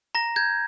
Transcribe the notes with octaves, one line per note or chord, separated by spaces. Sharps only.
A#5 A#6
G6 G#6